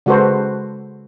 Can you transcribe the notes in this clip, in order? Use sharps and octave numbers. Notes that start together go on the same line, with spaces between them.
C#3 G#3 F#4 A4 B4 C5